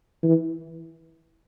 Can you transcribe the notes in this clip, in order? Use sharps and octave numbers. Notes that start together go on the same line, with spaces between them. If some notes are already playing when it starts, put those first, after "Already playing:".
E3